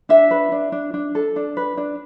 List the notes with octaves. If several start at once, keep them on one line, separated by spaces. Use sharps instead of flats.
D4 E5
B4
D4
D4
D4
A4
D4
B4
D4